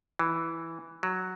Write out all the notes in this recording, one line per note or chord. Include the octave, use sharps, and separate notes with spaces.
E3
F#3